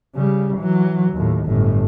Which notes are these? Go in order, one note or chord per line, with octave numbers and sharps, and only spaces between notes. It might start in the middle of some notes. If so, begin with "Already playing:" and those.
C#3 G3
E3 F#3
D#2 A2
G1 A2